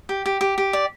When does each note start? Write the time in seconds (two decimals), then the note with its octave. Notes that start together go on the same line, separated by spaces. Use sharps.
0.09 G4
0.26 G4
0.41 G4
0.58 G4
0.73 D5